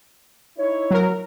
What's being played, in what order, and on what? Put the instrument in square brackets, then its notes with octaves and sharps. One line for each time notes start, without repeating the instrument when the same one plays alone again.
[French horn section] D#4 E4 C#5
[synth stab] F#3 A#4